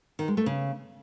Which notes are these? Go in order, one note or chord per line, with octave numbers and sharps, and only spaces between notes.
D#3
G#3
A3
C#3